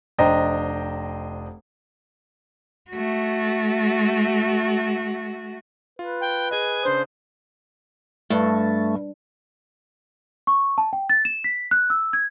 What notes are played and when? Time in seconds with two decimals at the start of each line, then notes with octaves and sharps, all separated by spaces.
0.18 F1 D4 C5 D#5 G5 A#5
2.91 A3 F#4
5.99 F4 B4
6.21 G5
6.51 G#4 D#5 G#5
6.83 C#3 D4 C5 D#6
8.30 G2 A3
10.47 C#6
10.78 A5
10.93 G5
11.10 A6
11.25 E7
11.44 B6
11.71 F#6
11.90 E6
12.13 G#6